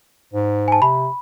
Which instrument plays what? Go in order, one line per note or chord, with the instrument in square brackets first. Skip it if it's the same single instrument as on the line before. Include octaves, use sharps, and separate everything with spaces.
[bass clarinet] G#2
[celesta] G#5 A5
[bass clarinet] C3 [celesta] B5